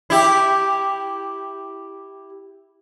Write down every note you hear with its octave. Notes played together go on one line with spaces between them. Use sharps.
E4 G4